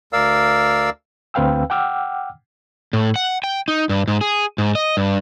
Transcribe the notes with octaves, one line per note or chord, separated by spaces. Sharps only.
D2 A#4 D5 F5 E6
D2 C4 B4 F5 G5 E6
F#5 G5 D6 E6 F6
A2
F#5
G5
D#4
G2
G#2
G#4
G#2
D#5
G2